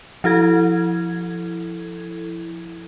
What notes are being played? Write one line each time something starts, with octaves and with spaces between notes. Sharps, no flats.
F3 E4 A4 G#6